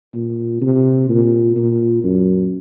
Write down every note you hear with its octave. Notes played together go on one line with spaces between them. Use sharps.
A#2
C3
A#2
A#2
F#2